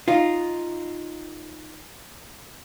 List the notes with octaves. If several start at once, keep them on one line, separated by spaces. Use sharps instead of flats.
D#4 F4